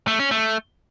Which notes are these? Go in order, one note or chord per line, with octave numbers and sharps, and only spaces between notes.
A3
C#4
A3